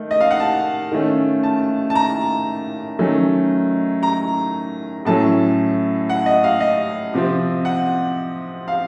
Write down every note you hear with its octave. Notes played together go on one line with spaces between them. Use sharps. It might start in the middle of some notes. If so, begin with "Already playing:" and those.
Already playing: D#3 A3
D#5
F5
F#5
A5
D#3 A3 C#4
A5
A5
A#5
D#3 F#3 A3 C#4
A#5
A2 F#3 A3 C#4 A5
F#5
D#5
F5
D#5
C3 F3 C4
F#5
F5